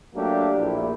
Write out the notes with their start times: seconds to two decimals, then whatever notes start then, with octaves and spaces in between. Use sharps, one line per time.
0.15 F#3 A3 A#3 D4 G4
0.57 A#1 A#2 E4